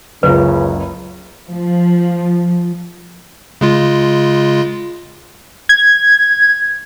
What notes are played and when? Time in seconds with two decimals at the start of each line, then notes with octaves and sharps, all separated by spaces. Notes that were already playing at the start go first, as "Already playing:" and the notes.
0.23 F#1 C#2 C#3 B4
1.51 F3
3.61 C#3 G#3 F4
5.69 G#6